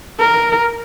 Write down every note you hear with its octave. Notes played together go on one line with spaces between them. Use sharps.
A#4